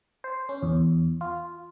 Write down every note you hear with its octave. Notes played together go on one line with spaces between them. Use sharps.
C5
C#4
E2
F4